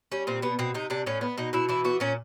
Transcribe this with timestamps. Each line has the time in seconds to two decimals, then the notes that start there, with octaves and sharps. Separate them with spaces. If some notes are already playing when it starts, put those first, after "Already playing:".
0.12 G3 C#4
0.27 A#2 C4
0.42 B2 B3
0.59 B2 C4
0.74 C3 D#4
0.90 C3 D4
1.06 A2 C#4
1.21 B3
1.38 B2 D#4
1.53 B2 E4
1.69 E3 E4
1.84 B3 F#4
2.00 A#2 C#4